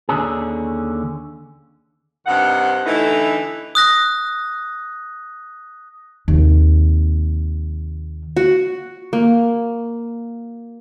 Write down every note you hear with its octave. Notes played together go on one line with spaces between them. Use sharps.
D#2 D3 C#4 G#4
G2 C3 D#3 F#5
D3 E3 A3 D#4 E4 B4
D#6 F#6 A#6
D#2 C3
F#4
A#3